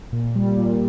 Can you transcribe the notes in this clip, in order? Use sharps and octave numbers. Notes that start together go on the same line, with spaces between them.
A#2
G3
A#2